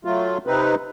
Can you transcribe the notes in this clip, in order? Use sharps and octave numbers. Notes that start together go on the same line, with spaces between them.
F#3 A3 F4
C3 C4 D#4 B4